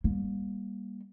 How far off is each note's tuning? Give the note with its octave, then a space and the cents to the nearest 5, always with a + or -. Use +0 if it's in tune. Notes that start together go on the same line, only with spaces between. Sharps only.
G3 +20 A#3 +35